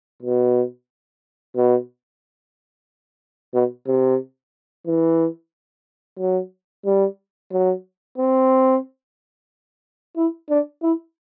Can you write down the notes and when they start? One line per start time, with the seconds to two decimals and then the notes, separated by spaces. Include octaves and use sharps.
0.22 B2
1.56 B2
3.54 B2
3.87 C3
4.87 E3
6.19 F#3
6.85 G3
7.52 F#3
8.18 C4
10.17 E4
10.50 D4
10.82 E4